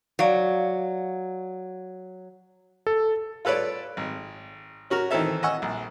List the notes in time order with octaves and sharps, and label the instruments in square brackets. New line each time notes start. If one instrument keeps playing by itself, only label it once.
[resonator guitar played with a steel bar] F#3 [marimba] D5 F5
[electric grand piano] A4
[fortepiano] F4 A4 B4 C#5 D5
G#1
C#4 F#4 A#4
D#3 E3 C4 D#4 A4 E5
D#5 F#5 G#5 C#6 E6
A#1